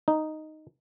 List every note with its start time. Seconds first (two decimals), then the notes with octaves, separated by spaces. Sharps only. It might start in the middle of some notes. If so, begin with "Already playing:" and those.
0.08 D#4